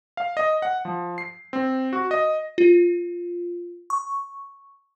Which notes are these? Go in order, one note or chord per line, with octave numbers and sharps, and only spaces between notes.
F5
D#5
F#5
F3
C7
C4
F#4
D#5
F4
C#6